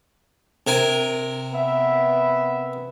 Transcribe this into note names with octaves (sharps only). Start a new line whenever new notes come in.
C3 A#4 G#5
B3 E5